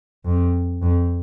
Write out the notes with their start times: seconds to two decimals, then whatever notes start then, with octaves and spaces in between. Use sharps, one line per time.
0.25 F2
0.82 F2